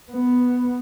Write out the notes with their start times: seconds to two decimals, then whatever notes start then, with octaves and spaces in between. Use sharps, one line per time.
0.12 B3